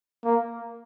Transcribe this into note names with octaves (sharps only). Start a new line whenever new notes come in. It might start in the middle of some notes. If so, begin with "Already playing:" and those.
A#3